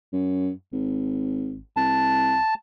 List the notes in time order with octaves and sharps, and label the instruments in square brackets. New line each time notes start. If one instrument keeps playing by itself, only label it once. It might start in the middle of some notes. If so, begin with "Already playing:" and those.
[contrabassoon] F#2
G#1
[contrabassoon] C2 [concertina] A5